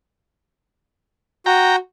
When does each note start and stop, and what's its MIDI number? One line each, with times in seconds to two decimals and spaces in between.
1.46 1.77 66
1.46 1.76 79
1.46 1.76 82